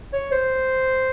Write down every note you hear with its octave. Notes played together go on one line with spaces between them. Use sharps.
C#5
C5